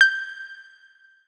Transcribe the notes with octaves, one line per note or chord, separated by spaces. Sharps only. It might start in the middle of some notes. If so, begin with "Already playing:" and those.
G6